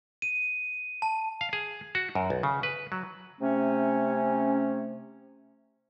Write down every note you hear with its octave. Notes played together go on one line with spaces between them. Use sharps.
D#7
A5
F5
G#4
F#4
F#2
B1
C#3
B4
F#3
C3 A3 C#4